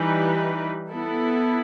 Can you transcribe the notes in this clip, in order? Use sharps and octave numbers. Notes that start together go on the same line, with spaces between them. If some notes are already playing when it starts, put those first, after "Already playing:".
Already playing: E3 G3 D#4 G4 B4
B3 E4 A4